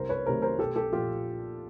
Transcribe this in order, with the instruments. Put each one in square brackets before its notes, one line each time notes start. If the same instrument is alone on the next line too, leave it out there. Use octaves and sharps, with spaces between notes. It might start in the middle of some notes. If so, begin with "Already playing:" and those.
Already playing: [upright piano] C2 A#4 C5
B4 C#5
C3 D#3 F#3 A3 A#4 C5
A#4 C5
B1 G4 A4
G4 A4
A#2 F3 F4 G4